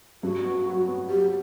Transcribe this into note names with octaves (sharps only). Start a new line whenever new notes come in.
G2 F#4
B3
F#3
B3
F#3 G4